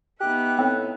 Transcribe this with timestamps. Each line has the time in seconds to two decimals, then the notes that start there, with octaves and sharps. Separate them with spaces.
0.20 B3 D#4 G4 E5 F#6
0.59 A2 C4